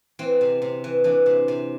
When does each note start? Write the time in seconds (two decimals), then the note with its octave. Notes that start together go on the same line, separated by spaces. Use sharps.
0.19 E3 C4
0.41 C3
0.62 C3
0.84 E3
1.04 E3 D4
1.26 C3
1.48 C3